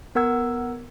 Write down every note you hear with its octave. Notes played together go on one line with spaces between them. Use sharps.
B3 A#4 F#5 E6 G#6